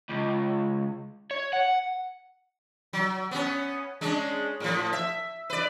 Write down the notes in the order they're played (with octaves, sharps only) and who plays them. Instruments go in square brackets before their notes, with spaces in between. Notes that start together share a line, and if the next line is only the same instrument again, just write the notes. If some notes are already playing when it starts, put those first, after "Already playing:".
[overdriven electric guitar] C#2
C#5
F#5
[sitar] F#3
B3 C#4
G#3 C#4 D4
A2 F3
E5
B4 D5